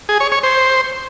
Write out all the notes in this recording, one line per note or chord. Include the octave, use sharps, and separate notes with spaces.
G#4
C#5
C#5
C5